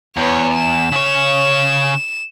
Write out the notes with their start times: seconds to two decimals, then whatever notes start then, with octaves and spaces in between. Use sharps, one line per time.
0.17 E2 B3 C#5
0.55 E7
0.92 C#3 C#5